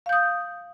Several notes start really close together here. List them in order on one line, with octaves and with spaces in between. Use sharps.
F5 G6 D#6